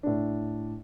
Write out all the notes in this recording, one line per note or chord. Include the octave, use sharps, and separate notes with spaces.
A2 D4